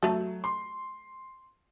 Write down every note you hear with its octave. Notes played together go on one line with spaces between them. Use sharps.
F#3 A3 A4
C6